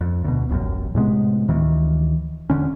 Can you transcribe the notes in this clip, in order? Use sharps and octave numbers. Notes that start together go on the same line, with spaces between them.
F2
D2 B2
D#1 A1 F#2
A2 C3 G#3 B3
D2 D#3 E3
E1 C2 D3 C#4